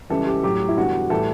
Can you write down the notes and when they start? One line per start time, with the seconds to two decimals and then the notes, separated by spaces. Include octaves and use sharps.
0.10 C#2 C#3 E3 G3 A4
0.27 G4
0.43 A2 F#3 G4
0.68 E4
0.77 E2 D3 G3 F#4
1.10 A2 E3 G3 A4